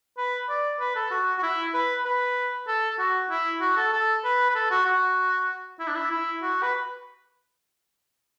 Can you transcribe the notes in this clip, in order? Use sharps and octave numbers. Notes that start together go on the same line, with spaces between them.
B4
D5
B4
A4
F#4
F#4
E4
B4
B4
A4
F#4
E4
F#4
A4
A4
B4
B4
A4
F#4
F#4
E4
D4
E4
E4
F#4
B4